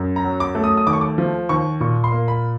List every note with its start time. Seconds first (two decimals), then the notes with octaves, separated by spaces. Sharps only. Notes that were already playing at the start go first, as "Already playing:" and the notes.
Already playing: F#2
0.16 A#5
0.24 F#3
0.40 D6
0.55 A3
0.64 D#6
0.77 D#6
0.87 D#2 D6
0.93 C#6
1.01 D6
1.18 F3
1.49 D#2 C#6
1.80 A#2 C#6
2.04 C6
2.12 A#3
2.28 B5